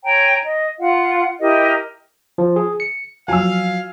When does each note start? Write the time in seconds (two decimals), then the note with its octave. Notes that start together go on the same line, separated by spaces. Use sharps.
0.03 C#5 G5 G#5 A#5
0.43 D#5
0.79 F4 F5 F#5
1.40 E4 G4 A#4 D#5
2.38 F3
2.56 G#4
2.80 C#7
3.28 F3 F#3 F5 G#5 E6